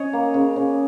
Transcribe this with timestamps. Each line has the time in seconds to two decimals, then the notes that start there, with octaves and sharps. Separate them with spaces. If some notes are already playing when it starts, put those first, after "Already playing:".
Already playing: C#4 C#5 D#5
0.13 A#3
0.34 C#3
0.56 C#3